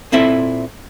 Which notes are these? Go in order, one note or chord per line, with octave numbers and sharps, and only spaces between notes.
A#2 C4 E4 A4 E5